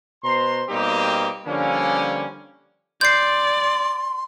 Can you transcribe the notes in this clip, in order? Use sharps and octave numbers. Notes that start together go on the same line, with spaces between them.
B2 C5 A#5 C6
B2 G3 A#3 C4 D#4 G4
D3 F3 G3 A#3 C#4
D5 C6 G6 C7